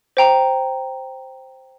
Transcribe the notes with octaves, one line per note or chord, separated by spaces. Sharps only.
C5 G5 A#5